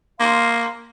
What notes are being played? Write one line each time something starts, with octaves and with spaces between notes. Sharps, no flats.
A#3 F5 C6